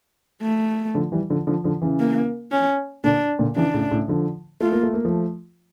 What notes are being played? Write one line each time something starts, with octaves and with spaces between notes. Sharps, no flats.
A3
D3 F3
E3 G3
D3 F3
D3 F3
D3 F3
C#3 E3
A#3
C#4
A#2 D3 D4
A#2 D3
C#3 E3 D4
A2 C#3
A2 C#3
D3 F3
A3 F4
A#3
A3
A#3
F3 A3